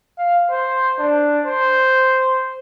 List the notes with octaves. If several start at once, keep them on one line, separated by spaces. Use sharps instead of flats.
F5
C5
D4
C5